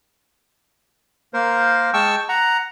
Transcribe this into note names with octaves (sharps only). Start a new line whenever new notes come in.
A#3 A#4 C5
G#3 G5 A5 C#6 E6
F#5 A#5